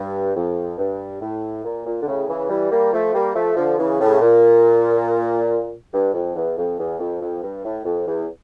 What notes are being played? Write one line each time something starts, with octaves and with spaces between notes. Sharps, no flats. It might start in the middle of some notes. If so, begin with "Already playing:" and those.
Already playing: G2
F2
G2
A2
A#2
A#2
D3
A2 C#3
C#3 E3
E3 G3
G3 A#3
F3 A3
G3 A#3
F3 A3
D3 F3
C#3 E3
A2 C#3
A#2
G2
F2
E2
F2
E2
F2
F2
G2
A2
F2
E2